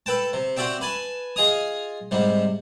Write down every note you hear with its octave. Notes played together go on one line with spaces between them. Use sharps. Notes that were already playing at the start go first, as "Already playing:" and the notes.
A4 B4 G5 A5
C3
C4 F#4 G4 D5 E5 G5
B4 G#5 A5
F4 G#4 D#5 G#5 A#5 D#6
G#2 C3 G3